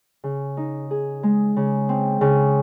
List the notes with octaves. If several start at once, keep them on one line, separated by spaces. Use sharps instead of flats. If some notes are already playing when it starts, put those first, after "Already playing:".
C#3
D#4
G#4
G#3
C#3
C4
C#3